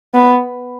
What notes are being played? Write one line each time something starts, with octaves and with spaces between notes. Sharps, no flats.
B3